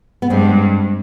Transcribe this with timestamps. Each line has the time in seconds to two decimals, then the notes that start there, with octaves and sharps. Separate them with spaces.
0.22 B3
0.30 G2 G#3 C4